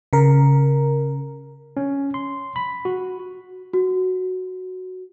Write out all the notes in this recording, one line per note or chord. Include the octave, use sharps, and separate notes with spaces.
C#3 A#4
C#4
C6
B5
F#4
F#4